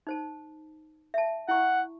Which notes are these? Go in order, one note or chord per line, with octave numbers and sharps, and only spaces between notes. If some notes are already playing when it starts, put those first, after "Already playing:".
D#4 C5 A5
E5 A5
E4 F#5 C#6